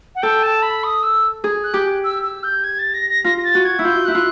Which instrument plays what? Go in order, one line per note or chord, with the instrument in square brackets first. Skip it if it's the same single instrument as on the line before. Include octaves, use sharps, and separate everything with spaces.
[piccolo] F#5
[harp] A4 [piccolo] G5
[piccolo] A5
B5
D#6
E6
[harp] G#4
[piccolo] F#6
[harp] G4
[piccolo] E6
E6
G6
G#6
A6
A#6
A#6
[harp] F4 [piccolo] A#6
[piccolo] A#6
A6
[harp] F#4
[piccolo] G#6
[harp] E4
[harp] F4 [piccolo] G6
[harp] E4 [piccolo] F#6
[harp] F4